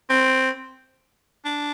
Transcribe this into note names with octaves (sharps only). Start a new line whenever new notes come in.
C4
D4